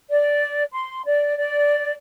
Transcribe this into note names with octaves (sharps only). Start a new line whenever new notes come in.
D5
C6
D5
D5